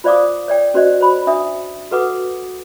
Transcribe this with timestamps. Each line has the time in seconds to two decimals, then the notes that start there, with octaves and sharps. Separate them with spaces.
0.04 F4 C5 D5 F5 D6 D#6
0.48 C#5 D5 G5
0.74 C#4 F#4 C5 D5 D#5
1.01 C5 B5
1.27 D4 E5 D#6
1.91 F#4 A4 B4 F#5 D6 D#6